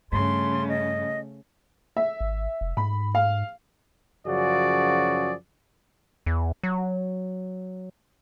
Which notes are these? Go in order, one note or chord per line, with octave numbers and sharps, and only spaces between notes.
G2 C#3 A3 C6
D#5
E5
G#1
F1
G#2 B5
F5
F#2 C#3 F3 F#4 G#4 D5
E2
F#3